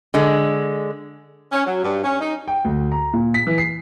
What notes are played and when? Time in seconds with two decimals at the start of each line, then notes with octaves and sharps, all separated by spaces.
0.14 D3 G#3
1.52 C#4
1.65 F#3
1.84 G2
2.03 C#4
2.20 D#4
2.48 G5
2.65 D2
2.92 A#5
3.13 A#2
3.34 B6
3.47 E3
3.58 C7